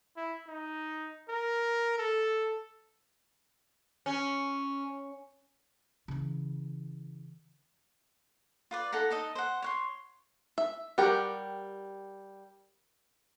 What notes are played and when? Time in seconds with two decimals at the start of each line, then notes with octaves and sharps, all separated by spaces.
0.17 E4
0.48 D#4
1.29 A#4
1.98 A4
4.06 C#4
6.08 C#3 E3
8.71 F4 B4 D5
8.92 D#4 A4 F#5 A#5
9.10 D#4 A4 D#5
9.35 C5 F#5
9.62 C#5 F#5 C6
10.58 E5
10.98 G3 G4 A#4 F#5 G5